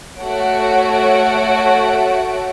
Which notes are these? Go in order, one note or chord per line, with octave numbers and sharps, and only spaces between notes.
A3 F#4 A4 C#5 F#5 D7